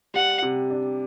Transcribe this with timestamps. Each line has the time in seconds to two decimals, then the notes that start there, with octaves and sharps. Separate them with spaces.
0.14 G3 F#5
0.42 C3
0.70 D4